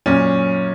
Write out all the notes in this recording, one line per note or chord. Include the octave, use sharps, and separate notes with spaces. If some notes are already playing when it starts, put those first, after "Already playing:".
F#2 A#2 C#4